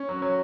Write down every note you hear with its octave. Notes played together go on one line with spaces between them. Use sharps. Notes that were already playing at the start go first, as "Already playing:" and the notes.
Already playing: C#4
F#3
F#3